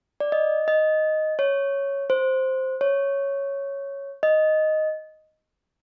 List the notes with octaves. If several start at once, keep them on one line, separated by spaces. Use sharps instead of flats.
D5
D#5
D#5
C#5
C5
C#5
D#5